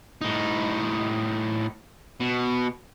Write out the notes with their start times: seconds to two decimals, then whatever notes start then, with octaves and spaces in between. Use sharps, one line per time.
0.21 A2 D#4
2.20 B2